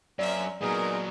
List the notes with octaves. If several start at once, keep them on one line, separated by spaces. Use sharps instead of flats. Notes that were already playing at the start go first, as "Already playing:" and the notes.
F#2 A#3 C4 D5 E5
A#2 F#3 B3 D#4 G#4 A#4